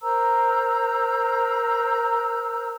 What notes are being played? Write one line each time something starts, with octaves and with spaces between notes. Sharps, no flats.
A#4 C5 A#5 E6